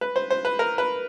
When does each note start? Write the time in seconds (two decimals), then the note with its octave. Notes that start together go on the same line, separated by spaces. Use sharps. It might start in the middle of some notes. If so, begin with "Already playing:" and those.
0.01 B4
0.16 C5
0.30 C5
0.45 B4
0.59 A#4
0.78 B4